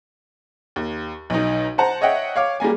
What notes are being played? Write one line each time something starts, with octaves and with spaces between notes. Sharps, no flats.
D#2
B1 D#4
C5 F#5 A5 A#5
C#5 D#5 E5 F#5 G5
C#5 F5 D6
G3 G#3 A#3 G#5